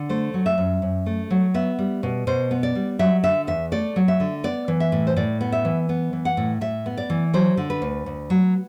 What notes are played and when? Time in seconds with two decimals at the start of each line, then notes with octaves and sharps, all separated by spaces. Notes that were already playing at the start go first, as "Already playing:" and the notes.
Already playing: D3
0.09 A3 C5
0.34 F#3
0.46 E5
0.58 F#2
0.82 F#2
1.06 A3
1.31 F#3
1.54 B3 E5
1.79 G3
2.03 B2
2.27 B2 C5
2.51 B3
2.63 D5
2.75 G3
2.99 F#3 E5
3.24 D3 E5
3.47 E2 E5
3.72 A3 D5
3.96 F#3
4.08 E5
4.20 D3
4.44 B3 D5
4.68 E3
4.80 E5
4.92 A2
5.07 C5
5.16 A2 D5
5.41 B3
5.52 E5
5.65 E3
5.89 B3
6.13 E3
6.25 F#5
6.37 A2
6.61 A2 E5
6.86 B3
6.98 D5
7.10 E3
7.34 F#3 C5
7.57 D3
7.70 B4
7.82 D2
8.06 D2
8.30 F#3